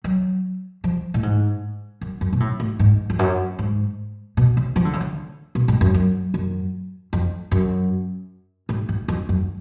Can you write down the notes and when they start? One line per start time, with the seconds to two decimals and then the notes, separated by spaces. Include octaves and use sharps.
0.04 F#3
0.84 F3
1.14 A2
1.23 G#2
2.01 F#2
2.21 F#2
2.33 B2
2.40 A2
2.60 A2
2.79 G#2
3.10 F2
3.19 F#2
3.59 G#2
4.37 B2
4.57 C#3
4.76 F3
4.85 D3
4.93 C#3
5.01 D3
5.55 B2
5.68 G#2
5.81 F#2
5.94 F#2
6.34 F#2
7.13 F2
7.51 F#2
8.69 G#2
8.89 G#2
9.08 F2
9.29 F#2